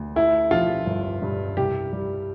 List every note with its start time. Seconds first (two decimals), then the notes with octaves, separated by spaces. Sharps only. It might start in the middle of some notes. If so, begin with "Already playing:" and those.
Already playing: D2
0.16 A3 E4
0.51 F3 F4
0.86 G1
1.22 G2
1.57 C2 G4
1.93 G3